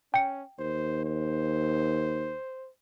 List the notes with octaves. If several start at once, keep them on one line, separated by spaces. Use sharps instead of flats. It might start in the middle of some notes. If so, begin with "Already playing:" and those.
C#4 G5 C#7
D#2 C5
C5